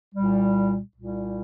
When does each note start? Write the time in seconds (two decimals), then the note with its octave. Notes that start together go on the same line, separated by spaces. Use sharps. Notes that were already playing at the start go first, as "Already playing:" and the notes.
0.14 C2 A#2 G3
0.95 C2 A#2 G3